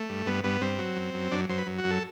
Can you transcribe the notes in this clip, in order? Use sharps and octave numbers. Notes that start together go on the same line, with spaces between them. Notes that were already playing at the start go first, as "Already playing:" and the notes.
Already playing: A3
G2
G2 B3
G2 B3
G2 C4
F#3
F#2
F#2
F#2 D4
F#2 C5
B4
F#2
F#4
F#2
A4